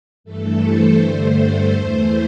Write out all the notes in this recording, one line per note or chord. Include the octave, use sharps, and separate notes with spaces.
G2 E3 A3 A4
C5
G2 D3 A3 C5
A4
E2 E3 A3 C5